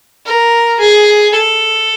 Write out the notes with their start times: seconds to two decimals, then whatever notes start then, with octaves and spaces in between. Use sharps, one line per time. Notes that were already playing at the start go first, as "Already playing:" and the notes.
0.26 A#4
0.80 G#4
1.34 A4